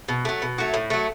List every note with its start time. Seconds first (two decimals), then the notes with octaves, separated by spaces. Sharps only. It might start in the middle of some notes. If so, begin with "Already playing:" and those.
0.08 B2
0.25 F#3 A3
0.42 B2
0.58 F#3 A3
0.74 A2
0.90 F#3 A3